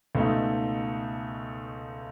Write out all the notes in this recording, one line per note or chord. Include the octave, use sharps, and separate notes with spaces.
C#2 B2 A3 D#4